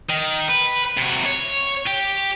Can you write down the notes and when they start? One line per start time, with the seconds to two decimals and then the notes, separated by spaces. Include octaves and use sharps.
0.10 D#3
0.49 B4
0.98 C3 F#4
1.26 C#5
1.87 G4